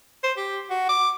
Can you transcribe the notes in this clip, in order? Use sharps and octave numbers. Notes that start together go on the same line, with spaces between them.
C5
G4
F#4
D6